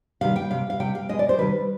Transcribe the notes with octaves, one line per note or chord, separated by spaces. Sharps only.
C3 D#3 G3 F5
G5
C3 G3 F5
F5
C3 G3 G5
F5
B2 G#3 D#5
D5
C5
C3 D#3 G3 B4